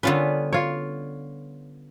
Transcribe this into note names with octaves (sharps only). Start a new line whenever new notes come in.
D3 G3 B3 C#4 F4 B4
F4 C#5